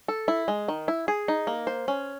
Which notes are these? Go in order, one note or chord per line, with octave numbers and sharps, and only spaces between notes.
A4
E4
G#3
D#3
E4
G#4
D#4
A#3
C5
C#4